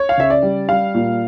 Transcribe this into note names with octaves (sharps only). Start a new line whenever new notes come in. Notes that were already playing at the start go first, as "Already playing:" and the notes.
Already playing: C#5
F5
C#3 E5
D5
G3
G3 F5
A#2